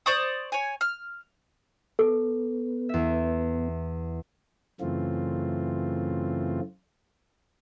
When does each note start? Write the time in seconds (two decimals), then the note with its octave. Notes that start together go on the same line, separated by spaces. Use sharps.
0.06 C5 D5 C#6 D#6
0.52 C#5 G#5
0.81 F6
1.99 B3 A4
2.89 E2 E5
4.81 F#2 C#3 E3 A3 C4 F4